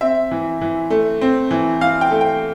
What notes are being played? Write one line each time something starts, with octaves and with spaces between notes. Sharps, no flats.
C4 E5
E3
E3
A3
C4
E3
E3 F5
G5
A3
G5